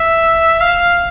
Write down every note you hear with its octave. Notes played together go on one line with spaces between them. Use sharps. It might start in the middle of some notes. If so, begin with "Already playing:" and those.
Already playing: E5
F5